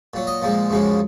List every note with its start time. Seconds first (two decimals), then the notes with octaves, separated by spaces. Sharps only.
0.14 A#2 F#3
0.27 D#5
0.42 A#2 F3 G#3
0.70 F#2 C#3 F3 G#3